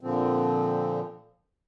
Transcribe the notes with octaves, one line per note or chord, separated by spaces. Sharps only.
A#2 D3 F3 C4